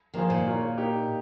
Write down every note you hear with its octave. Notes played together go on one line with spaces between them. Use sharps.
D#3 F3 A#3 F4 G#4 C5
A#2
A#3 F4 A#4 C#5
A#3 D#4 G4